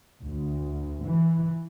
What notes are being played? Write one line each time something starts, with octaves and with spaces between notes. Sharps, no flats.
D2
E3